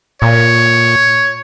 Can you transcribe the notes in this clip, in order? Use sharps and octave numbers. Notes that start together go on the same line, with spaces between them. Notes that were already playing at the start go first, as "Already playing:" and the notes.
A#2 C#5